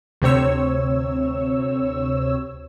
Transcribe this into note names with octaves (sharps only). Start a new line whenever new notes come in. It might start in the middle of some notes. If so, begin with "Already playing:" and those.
D2 C3 C4 C#5 E6